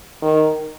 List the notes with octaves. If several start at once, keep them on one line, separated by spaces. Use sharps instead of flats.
D#3